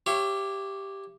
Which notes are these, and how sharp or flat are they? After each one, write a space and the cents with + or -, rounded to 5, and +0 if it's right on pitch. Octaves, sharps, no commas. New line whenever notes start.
G4 +0 C#5 -15 E5 +40